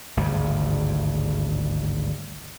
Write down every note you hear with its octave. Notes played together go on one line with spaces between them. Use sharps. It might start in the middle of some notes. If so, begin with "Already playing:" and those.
G#1 D2 G2 C#3